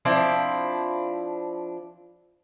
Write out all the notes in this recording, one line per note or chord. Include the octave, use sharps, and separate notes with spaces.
F3 C4 D4 E4